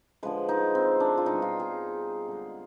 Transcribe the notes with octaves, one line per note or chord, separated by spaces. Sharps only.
D3 F3 G#3 B4
D#4
C4
D4
F4
B2 G3 D#4
F4
G#4
D3 G#3